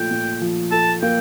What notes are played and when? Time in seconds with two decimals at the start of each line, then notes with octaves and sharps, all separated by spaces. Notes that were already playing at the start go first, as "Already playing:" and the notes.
Already playing: A#2 F3 A3 G5
0.11 A#2
0.41 F3
0.72 A4 A5
1.02 A#3 G5